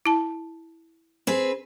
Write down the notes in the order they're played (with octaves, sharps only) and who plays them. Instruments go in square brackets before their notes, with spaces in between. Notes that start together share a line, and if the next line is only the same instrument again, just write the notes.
[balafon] E4 A5
[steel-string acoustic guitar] C4 G#4 B4